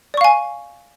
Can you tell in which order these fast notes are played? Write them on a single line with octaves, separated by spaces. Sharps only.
D5 C#6 F5 G#5